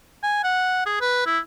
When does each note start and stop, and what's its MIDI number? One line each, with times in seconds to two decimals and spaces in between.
0.23 0.39 80
0.44 0.84 78
0.86 0.99 68
1.01 1.25 71
1.26 1.39 64